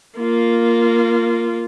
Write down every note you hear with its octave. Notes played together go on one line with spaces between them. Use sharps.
A#3 F4